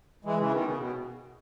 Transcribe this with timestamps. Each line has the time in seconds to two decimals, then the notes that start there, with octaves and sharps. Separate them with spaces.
0.25 E3 G#3
0.38 C#3 E3
0.51 B2 D#3
0.65 C#3
0.78 B2